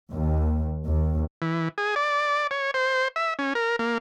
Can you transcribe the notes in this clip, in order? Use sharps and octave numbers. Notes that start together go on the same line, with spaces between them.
D#2
D#2
E3
G#4
D5
C#5
C5
E5
C#4
A#4
A#3